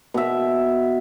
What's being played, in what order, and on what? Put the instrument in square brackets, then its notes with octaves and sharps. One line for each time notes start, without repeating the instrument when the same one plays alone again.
[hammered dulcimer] B2 E5